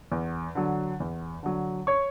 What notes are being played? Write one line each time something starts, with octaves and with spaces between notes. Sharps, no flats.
E2
D3 F#3
E2
D3 F#3
C#5 C#6